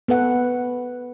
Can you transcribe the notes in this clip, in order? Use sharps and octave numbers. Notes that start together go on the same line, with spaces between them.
B3 A4 B4 F#5